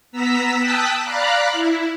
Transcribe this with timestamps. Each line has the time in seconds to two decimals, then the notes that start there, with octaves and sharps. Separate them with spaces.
0.12 B3 A#5 E6 B6
0.59 G5 A5 D#6 E6 F#6 B6
1.05 D5 F5 A#5 B5 F#6
1.52 E4